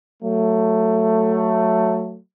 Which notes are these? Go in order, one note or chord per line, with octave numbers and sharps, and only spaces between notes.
F#3 A3